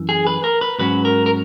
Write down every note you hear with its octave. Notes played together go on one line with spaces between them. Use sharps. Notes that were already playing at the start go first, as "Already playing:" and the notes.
Already playing: F#2 E3
G#4
B4
A#4
B4
G#2 F#3 C#4 B4
A#4
A#4